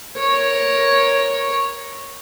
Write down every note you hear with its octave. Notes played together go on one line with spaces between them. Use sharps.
A#4 C#5